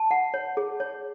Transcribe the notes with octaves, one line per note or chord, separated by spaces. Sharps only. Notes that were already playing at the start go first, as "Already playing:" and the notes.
Already playing: A5
F#5
C#5
G#4
C#5